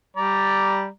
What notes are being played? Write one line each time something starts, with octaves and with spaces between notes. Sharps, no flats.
G3 D5 A#5